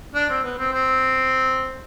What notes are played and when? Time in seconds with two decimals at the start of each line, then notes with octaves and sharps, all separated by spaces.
0.14 D4
0.29 C4
0.43 B3
0.58 C4
0.73 C4